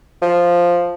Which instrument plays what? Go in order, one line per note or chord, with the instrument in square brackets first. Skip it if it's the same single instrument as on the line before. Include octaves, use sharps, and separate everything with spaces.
[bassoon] F3